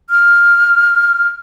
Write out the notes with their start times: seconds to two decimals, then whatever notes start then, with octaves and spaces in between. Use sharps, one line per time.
0.10 F6